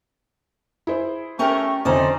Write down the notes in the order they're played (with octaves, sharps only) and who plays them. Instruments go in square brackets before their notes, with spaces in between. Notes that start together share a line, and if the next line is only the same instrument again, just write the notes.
[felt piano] E4 G#4 C5
[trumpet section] A3 G5 C#6 [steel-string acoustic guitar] C#4 G4 A#4
[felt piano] F2 D3 [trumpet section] C#4 D#4 A#5 [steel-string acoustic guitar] A4 C5 D5